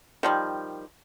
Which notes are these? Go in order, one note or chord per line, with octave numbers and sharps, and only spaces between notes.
D#3 F3 G3